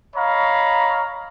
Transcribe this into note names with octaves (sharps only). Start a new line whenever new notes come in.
C#5 D#5 F5 A#5 B5